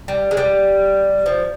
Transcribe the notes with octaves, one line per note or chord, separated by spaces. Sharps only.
G3
G#3
G3
F3